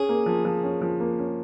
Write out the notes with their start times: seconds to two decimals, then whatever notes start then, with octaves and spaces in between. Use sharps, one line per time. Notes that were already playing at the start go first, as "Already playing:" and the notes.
Already playing: C#4 G#4
0.09 A#3
0.26 F3
0.45 F3
0.63 C#4
0.81 F3
1.00 A#3
1.19 C#4